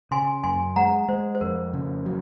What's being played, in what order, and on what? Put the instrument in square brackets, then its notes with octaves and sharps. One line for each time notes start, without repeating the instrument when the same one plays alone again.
[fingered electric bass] C#3 [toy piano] G#5 C6
[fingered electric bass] F#2 [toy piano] G#5 C6
[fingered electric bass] G#3 [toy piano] F#5 A#5
[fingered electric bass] G#3 [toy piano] C5
[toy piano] C5
[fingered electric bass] F2 [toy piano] A#4
[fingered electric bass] C#3
F#3